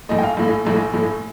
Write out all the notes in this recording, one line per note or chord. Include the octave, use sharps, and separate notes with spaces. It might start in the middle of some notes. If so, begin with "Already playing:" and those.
A#1 A2 A3 D#5
G5
F5
A#1 A2 A3
A#1 A2 A3
A#1 A2 A3